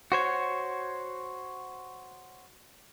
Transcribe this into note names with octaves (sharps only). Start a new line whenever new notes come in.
F#4 C5 C#5